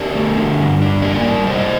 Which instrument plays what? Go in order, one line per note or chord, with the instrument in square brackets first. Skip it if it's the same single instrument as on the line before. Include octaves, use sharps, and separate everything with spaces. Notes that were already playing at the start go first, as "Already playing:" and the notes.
Already playing: [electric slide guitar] D4 G4 A#4
A3
D3
G2
D4
A#3 A#4 D5
G3
C3 C5 D#5